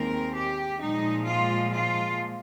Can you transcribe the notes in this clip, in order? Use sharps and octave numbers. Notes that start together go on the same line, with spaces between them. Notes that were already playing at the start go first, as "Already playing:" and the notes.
Already playing: D#2 D#3 G#3 C4 A#4
G4
A#2 F3 G#3 D#4
F4
F4